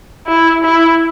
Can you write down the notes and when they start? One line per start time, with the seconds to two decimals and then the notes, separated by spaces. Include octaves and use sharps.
0.27 E4
0.63 E4